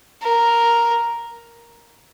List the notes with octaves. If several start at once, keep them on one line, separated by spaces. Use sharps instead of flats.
A#4